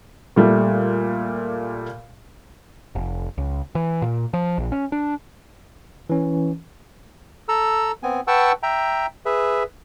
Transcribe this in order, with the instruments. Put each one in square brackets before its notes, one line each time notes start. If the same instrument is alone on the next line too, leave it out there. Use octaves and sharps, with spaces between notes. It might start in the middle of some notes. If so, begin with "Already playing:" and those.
[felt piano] A#2 G3 A3
[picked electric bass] F1
C#2
E3
A#2
F3
A#1
C#4
D4
[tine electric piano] E3 C#4
[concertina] A4 A#5 E6
B3 C4 G#5
B4 F#5 G5 A5 C#6 E6
E5 G5 A#5
G#4 B4 E5